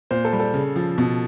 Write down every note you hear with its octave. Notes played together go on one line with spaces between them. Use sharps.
A#2 C5
A4
G3
A4
C#3
F3
B2